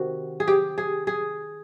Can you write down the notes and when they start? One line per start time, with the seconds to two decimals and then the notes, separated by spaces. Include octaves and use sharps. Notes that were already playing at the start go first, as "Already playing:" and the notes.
Already playing: C3 D#3 F#4
0.40 G#4
0.48 G4
0.78 G#4
1.07 G#4